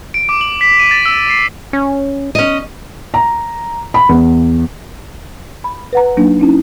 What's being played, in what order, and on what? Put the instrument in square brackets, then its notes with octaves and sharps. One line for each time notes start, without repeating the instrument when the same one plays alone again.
[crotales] D7
D6
F#7
B6
D#7
A6
E6
C7
[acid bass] C#4
[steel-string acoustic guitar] C#4 D#5
[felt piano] A#5
B5
E2
[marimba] B5
B4 F#5 A#5
F#3 A#3 D4 D#4
C#4 D#4 E4